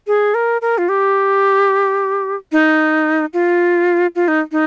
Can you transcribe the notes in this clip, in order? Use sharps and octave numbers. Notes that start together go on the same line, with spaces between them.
G#4
A#4
A#4
F4
G4
D#4
F4
F4
D#4
D#4